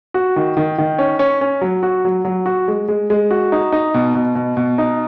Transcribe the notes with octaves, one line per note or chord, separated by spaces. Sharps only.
F#4
D#3
D#3
D#3
C#4
C#4
C#4
F#3
F#4
F#3
F#3
F#4
G#3
G#3
G#3
F#4
D#4
D#4
B2
B2
B2
B2
D#4